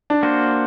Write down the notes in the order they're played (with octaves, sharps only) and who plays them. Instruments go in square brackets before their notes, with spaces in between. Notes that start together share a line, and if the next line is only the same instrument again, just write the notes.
[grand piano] D4
[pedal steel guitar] A#3 F#4 C5